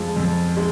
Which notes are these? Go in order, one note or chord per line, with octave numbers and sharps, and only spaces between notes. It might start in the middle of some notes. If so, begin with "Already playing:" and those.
Already playing: F2 F3 G#3
F2
G#3